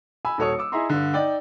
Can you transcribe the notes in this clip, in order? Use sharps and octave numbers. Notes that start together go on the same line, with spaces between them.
G#5 B5 E6
D#1 F#4 A4 C#5 D#6 C#7
D6 E6
E4 G#4 D#5 E5 A#5 C6
G2 D3
D#4 D5 G5